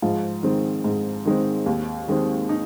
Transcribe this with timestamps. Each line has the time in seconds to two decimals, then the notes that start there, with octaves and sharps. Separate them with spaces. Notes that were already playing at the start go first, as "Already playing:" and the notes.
0.02 G#2 F3 F4
0.43 D#3 G#3 C4
0.84 G#2
1.25 D#3 G#3 C4
1.66 D#2
2.08 D#3 G#3 C4
2.49 D#4